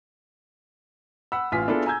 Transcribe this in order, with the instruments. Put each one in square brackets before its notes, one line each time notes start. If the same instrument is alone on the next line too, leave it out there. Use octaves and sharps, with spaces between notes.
[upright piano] F#5 B5 E6
A1 F4 G#5 B6
B3 D4 E4 F4 G#4 A4
G#5 A#5 E6 G6 G#6